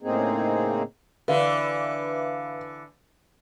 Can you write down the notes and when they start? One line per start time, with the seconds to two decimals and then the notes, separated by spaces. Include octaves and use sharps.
0.03 A2 C#3 A#3 C4 D#4 G#4
1.28 D3 E3 B4 E5 F5